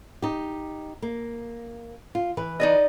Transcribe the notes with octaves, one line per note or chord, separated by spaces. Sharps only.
D#4 G4
A#3
F4
E3 B4
D#4 D5 D#5